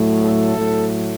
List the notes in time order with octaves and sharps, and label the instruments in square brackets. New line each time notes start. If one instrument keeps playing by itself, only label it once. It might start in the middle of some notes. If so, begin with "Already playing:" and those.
Already playing: [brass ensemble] A2 F#3 A3
A4
A2 F#3 A3